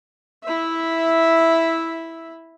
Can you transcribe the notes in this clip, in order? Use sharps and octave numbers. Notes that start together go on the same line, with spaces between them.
E4 E5